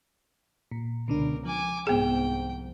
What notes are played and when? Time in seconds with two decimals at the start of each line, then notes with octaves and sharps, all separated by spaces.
0.71 A#2
1.08 C#2 B2 D3 D4 A#4
1.45 F3 G#5 D6
1.87 C2 G#2 B3 G#4 G5